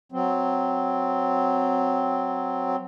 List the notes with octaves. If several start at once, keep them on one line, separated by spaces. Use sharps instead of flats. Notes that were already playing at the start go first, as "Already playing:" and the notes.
F#3 C4